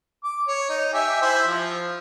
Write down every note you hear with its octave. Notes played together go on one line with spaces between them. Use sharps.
D6
C#5
D#4
G4 E5 G#5
E4 C5 E5
F3